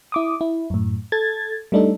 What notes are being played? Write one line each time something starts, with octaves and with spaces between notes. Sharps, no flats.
E4 D6 D#6
E4
F#2 A2
A4 G#6 A6
G3 A3 D4 D#4 A4